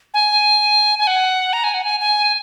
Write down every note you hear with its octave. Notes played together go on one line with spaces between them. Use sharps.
G#5
G#5
F#5
A#5
G#5
F#5
G#5
G#5